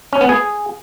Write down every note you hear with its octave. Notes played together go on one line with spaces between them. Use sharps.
C#4
B3
G#4